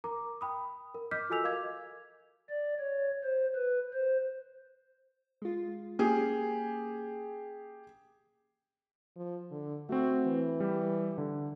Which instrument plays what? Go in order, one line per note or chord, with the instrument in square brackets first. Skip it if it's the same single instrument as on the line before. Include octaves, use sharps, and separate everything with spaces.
[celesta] A#4 A#5 D6
G5 B5 D#6
A#4
D#5 D6 F6 G6 B6
F4 F#4 A4 G#5 E6 F7
A#4 D#5 F5 D6 G#6
[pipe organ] D5
C#5
C5
B4
C5
[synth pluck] G#3 F4
[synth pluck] A#3 C#4 G#5 [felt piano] G4 G#4
[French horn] F3
D3
[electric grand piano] A3 C4 [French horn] F#4
[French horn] E3
[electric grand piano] G3 G4
D3